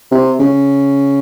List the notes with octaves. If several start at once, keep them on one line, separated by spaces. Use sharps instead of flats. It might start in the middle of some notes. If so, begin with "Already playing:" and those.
C3
C#3